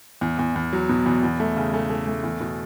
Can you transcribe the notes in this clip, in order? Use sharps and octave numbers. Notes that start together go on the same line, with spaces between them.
E2
E2
E2
F#3
B2
E2
E2
A3
C#3
A3
A3
A3
E2
B2